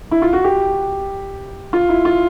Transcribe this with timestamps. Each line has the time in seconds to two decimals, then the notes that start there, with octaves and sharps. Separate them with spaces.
0.11 E4
0.22 F4
0.33 F#4
0.44 G4
1.73 F4
1.89 E4
2.05 F4